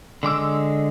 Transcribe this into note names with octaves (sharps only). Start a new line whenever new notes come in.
D3 G#3 D6 E6